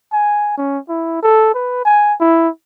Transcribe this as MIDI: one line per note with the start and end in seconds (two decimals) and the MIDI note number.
0.13 0.53 80
0.57 0.78 61
0.89 1.19 64
1.22 1.52 69
1.54 1.81 71
1.85 2.14 80
2.20 2.48 64